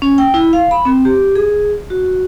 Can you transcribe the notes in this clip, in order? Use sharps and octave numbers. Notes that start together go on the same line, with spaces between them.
C#4
G5
E4
F5
B5
C4
G4
G#4
F#4